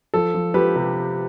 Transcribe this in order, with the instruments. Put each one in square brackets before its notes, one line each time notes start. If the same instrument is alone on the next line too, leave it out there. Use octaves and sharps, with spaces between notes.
[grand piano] F3 A4
F3
F3 G4 B4
C3